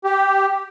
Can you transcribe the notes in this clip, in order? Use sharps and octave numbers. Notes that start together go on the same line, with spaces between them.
G4